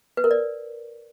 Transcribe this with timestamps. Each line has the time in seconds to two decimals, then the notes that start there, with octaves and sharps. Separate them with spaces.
0.17 B4
0.24 A#4
0.31 D5